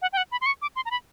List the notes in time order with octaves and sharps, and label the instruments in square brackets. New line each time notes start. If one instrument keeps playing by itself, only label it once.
[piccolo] F#5
G5
F#5
B5
C6
C#6
D6
C6
A#5
B5